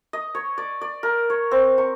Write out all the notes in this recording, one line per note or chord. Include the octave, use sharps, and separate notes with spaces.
D#5
C#5
D5
D5
A#4
C#5
C4
C#6